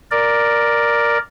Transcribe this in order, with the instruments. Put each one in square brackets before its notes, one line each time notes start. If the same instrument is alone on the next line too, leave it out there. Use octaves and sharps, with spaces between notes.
[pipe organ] A#4 D5